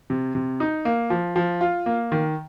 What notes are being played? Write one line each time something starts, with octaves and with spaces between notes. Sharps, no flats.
C3
C3
D#4
A#3
F3
F3
F4
A#3
D#3